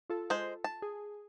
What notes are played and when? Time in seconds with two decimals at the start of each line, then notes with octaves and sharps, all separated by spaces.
0.10 F4 A4
0.30 G#3 C5
0.64 A5
0.82 G#4